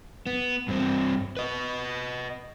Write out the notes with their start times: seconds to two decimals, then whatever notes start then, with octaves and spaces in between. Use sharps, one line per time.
0.27 B3
0.68 G2 C4
1.37 B4 D#5